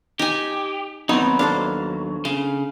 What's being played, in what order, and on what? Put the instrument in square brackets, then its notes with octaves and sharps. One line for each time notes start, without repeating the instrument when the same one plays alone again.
[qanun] D#4 G#5 [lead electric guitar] G4
[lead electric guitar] D#2 F#3 [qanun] B3 [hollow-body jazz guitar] C4 D#4
[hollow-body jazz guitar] D4 A4 C5 [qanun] F5
[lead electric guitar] C#3 [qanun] F5